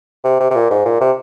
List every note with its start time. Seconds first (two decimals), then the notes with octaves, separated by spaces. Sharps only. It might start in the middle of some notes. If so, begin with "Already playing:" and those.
0.24 C3
0.40 C3
0.50 C3
0.55 A#2
0.70 G#2
0.86 A#2
1.01 C3